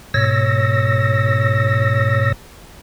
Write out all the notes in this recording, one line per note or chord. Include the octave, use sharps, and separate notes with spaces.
G#2 B2 C#5 E6 A#6